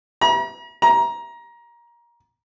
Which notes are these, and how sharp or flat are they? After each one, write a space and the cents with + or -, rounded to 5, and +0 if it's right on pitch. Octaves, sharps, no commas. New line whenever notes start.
A#5 +45
A#5 +20